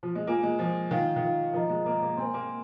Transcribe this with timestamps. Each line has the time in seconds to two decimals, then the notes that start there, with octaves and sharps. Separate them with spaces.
0.03 F3
0.15 G#3
0.27 A#3 F4 C5 G#5
0.43 G#3
0.59 F3 F4 C5 G#5
0.90 D#3 F4 A#4 F5
1.16 D#3
1.22 F4 A#4 F5
1.53 F3 A#4 D#5 A#5
1.70 G#3
1.85 A#3 A#4 D#5 A#5
2.02 A#3
2.17 C4 C5 G#5 C6
2.34 A#3